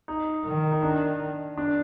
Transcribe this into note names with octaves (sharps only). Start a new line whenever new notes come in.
D#4
D#3
D#4
D4
D4